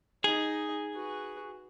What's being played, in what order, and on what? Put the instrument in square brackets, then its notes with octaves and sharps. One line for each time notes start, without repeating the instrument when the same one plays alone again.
[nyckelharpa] D#4 D#5 [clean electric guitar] G#4
[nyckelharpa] F#4 B4